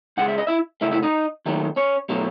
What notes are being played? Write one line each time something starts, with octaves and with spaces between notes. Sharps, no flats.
C#2 C#3 G#3 F#5
E5
D#5
E4 E5
F#2 C#3 F#3 A3 E4 E5
E4 E5
D#4 D#5
D#2 D#3 F#3 A3
C#4 C#5
B2 F#3 A3